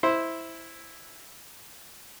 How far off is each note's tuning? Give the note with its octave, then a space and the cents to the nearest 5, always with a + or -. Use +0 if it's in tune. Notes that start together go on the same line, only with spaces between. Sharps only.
E4 -5 C5 +0